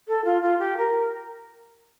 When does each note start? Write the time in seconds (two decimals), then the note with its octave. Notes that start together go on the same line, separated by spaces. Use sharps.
0.08 A4
0.25 F4
0.42 F4
0.59 G4
0.77 A#4